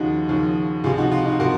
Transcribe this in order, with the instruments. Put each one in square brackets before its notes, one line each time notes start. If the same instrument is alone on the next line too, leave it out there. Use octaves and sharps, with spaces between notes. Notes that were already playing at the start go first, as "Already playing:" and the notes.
Already playing: [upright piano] D#2 C#3 F3 D#4 F#4
D#2 C#3 F3
C#2 C3 F3 F4 G#4
D#4 F#4
F4
D#4 F#4
C3 F3 F#4 A#4